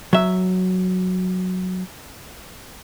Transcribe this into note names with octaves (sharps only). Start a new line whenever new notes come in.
F#3 E5